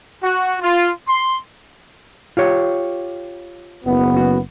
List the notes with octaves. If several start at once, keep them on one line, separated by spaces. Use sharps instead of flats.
F#4
F4
C6
F4 G4 C#5
F#1 B3
F#4